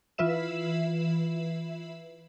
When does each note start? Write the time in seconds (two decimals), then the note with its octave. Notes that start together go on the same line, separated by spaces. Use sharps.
0.18 E3 F4 B4 E5 E7